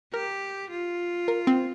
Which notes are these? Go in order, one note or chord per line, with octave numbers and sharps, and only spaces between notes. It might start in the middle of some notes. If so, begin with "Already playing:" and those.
G4 A#4
F4
A#4
C4